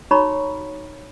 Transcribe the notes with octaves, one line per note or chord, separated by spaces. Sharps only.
D#4 F#4 C#5 A#5 B5 C#6